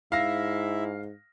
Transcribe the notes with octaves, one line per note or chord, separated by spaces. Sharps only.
G#2 E4 E5 F5 A#6